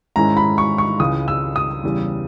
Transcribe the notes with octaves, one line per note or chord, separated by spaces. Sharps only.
G#2 D#3 G#3 C#4 E4 A#5
B5
C#6
C#6
C#2 C#3 E3 D#6
E6
D#6
E2 C#3 E3 G3